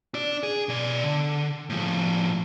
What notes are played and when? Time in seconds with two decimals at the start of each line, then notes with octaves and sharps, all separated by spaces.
0.14 D4 D5
0.43 G#4
0.69 B2 D5
1.04 D3
1.70 A2 F3